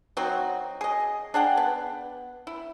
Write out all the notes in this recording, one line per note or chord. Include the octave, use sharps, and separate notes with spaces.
F#3 C4 D#4 F#4
G#4 D#5
D4 G#4 F#5 G5
B3
E4